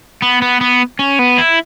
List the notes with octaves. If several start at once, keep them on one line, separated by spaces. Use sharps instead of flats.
B3
B3
B3
C#4
B3
E4